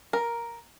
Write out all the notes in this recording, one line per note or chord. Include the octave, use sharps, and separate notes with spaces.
A#4